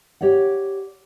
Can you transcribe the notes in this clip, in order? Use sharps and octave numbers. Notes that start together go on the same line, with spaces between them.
G4 C#5 D5 F#5